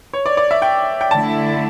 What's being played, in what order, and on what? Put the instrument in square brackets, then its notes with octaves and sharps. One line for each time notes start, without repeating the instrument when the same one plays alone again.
[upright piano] C#5
D5
D5
E5
G5
G5
[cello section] D3 A3 E4 [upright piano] A5